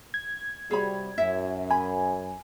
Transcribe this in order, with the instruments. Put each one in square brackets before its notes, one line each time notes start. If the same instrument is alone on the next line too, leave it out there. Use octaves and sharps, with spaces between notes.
[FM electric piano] G#6
[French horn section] C3 G3 F#4 [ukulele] G#4 C#5 B5
[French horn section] F#2 [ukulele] E4 E5
[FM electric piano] G#5 [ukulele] B5